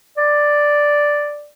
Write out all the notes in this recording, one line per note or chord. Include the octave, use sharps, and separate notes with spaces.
D5